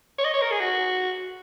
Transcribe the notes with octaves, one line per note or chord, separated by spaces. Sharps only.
C#5
D#5
C#5
A#4
G#4
F#4